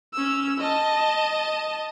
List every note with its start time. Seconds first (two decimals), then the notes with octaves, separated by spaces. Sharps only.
0.14 C#4 E6
0.60 D#5 A5